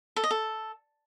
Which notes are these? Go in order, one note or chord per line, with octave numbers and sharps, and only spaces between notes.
A4
D#5
A4